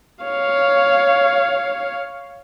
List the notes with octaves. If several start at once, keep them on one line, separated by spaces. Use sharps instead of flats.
C#5 F5